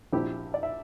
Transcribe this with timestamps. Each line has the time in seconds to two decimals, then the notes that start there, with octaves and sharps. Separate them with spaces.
0.13 A#1 A#2 F3 C4 E4 G4
0.54 D5
0.63 E5